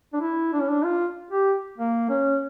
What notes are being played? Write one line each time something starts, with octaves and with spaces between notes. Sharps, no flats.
D4
E4
D4
C#4
D4
F4
G4
A#3
C#4